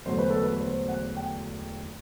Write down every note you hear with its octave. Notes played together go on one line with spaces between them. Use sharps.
E1 E2 D3 F#3 A3 C5
B4
A4
B4
C5
F#5
G5